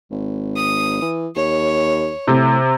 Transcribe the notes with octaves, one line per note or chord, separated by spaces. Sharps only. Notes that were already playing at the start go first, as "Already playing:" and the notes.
G#1
D#6
E3
D#2 C#5
A2 C3